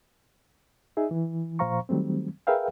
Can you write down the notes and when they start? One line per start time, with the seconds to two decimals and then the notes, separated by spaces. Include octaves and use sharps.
0.97 D#4 G#4 E5
1.11 E3
1.59 A#2 F3 C5 F5 A#5 C#6
1.89 D#3 F#3 G3 A3 C4
2.47 G#4 A#4 B4 E5 F5 G5